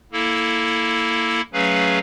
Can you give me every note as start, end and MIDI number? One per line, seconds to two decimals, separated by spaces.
0.12 1.41 58
0.12 1.41 64
0.12 1.41 69
1.53 1.99 54
1.53 1.99 57
1.53 1.99 61
1.53 1.99 68
1.53 1.99 71
1.53 1.99 77